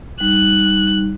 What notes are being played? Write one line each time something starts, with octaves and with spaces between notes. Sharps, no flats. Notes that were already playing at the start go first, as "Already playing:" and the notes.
G3 D#4 F#6